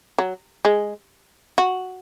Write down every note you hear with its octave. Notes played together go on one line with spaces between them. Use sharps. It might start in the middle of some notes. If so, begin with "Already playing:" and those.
F#3
G#3
F#4